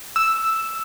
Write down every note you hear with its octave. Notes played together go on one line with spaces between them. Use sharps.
E6